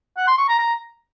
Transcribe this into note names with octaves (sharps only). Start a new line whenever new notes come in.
F#5
C6
C#6
A#5
A#5